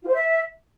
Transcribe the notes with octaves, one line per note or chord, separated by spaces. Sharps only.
F4
C5
E5